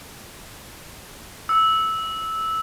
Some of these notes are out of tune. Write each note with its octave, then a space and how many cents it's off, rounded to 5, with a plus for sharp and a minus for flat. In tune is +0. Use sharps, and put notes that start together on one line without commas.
E6 -15